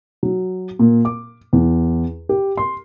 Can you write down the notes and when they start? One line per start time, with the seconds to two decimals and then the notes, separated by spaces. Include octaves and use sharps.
0.23 F#3
0.79 A#2
1.05 D6
1.53 E2
2.29 G4
2.57 C6